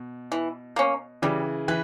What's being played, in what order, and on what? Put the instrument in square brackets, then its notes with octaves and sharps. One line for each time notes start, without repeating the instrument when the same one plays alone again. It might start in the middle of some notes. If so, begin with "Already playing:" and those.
Already playing: [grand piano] B2
[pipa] E3
A#3 C#4
[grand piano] C#3 E3 [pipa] G3
[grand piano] E3 [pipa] B4